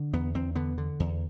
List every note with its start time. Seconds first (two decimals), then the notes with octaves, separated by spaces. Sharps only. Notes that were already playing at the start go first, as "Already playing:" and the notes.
Already playing: D3
0.13 E2 B3
0.34 E2 C4
0.55 D3 B3
0.78 D3
1.00 E2